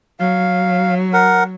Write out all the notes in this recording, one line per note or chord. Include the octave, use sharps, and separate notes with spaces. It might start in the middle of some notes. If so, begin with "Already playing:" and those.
F#3 F5
A#4 F#5